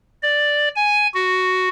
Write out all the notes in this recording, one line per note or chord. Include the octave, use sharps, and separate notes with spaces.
D5
G#5
F#4